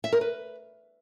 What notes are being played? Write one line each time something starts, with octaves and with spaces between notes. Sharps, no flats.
E5
A#4
B4